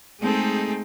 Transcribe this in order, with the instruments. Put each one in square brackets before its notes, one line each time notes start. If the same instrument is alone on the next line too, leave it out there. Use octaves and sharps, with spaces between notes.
[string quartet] G#3 A3 C4 D#4 G#4 A4